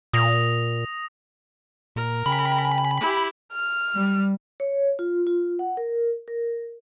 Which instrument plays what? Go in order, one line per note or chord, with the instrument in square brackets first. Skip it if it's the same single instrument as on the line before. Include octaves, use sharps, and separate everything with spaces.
[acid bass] A#2 [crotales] D#6 A#6 F7
[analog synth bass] A#2 [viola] A#4
[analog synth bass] C#3 [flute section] G5 G#5 [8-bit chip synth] B5
[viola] E4 G4
[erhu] F6
[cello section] G3
[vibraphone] C#5
F4
F4
F#5
A#4
A#4